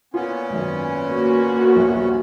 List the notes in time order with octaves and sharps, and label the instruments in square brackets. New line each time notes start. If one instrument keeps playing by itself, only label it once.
[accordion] A#2 B3 C#4 [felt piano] F4
[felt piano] G#1 F#2 D#3
[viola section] A#3 F#4
[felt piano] D#1 A#1 F3